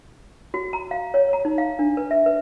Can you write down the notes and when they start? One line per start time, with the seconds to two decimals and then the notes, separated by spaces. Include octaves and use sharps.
0.54 F#4
0.73 A#5
0.91 F5
1.14 C#5
1.33 A#5
1.45 D#4
1.58 F5
1.79 D4
1.97 B4
2.11 E5
2.26 B4